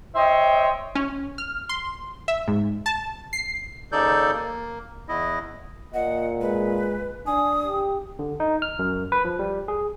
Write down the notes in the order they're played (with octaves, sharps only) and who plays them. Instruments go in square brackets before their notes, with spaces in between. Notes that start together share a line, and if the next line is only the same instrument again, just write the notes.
[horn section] C5 C#5 D#5 E5 G5
[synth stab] C#4
F6
C6
E5
G#2
A5
C7
[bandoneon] D#2 C#3 D#4 A4 D5 G6
A#3
E2 E4 D#5
[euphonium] A#2 [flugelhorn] D#5 [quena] F#5
[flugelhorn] G#3 [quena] B4
[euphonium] D4 [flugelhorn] G#5 [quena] D#6
[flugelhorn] G4
[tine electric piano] D3
D#4
F6
F#2
B4
F3
G3
G#4